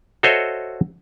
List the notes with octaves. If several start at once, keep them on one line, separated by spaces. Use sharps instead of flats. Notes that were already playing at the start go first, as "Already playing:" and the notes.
F#4 A4 C5 C#5 D#5 E5